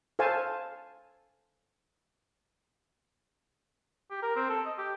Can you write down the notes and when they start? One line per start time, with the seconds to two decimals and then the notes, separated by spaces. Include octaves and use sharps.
0.19 A4 C5 F5 G#5 A5
4.10 G4
4.22 A#4
4.36 C4
4.50 A4
4.66 D#5
4.78 G4